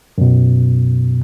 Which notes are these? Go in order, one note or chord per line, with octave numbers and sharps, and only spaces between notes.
F#2 B2